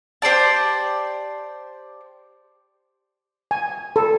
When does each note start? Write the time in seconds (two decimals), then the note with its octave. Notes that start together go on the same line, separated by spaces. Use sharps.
0.22 G4 C5 D5 A5
3.51 G#5
3.96 A4